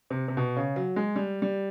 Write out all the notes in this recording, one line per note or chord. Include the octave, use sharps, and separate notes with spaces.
C3
C3
B2
C#3
F#3
G#3
G3
G3